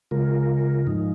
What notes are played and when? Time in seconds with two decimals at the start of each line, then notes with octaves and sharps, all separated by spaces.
0.11 C#3 G#3 F4 A#4
0.87 G#2 F3 G#3 D#4